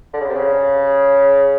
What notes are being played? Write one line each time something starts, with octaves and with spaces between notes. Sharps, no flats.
D3
C#3
C3
C#3